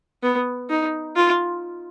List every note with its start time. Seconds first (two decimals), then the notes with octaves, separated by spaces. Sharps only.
0.23 B3
0.70 D#4
1.16 F4